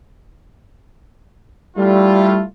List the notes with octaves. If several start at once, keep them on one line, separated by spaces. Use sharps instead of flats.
G3 A3 E4 F4